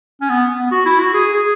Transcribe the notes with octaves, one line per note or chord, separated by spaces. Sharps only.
C#4
B3
B3
F#4
E4
F#4
G#4
G#4